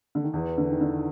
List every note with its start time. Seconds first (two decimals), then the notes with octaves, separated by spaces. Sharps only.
0.15 D3
0.24 D#3
0.33 E2 E3
0.58 D3
0.71 D#3
0.81 D3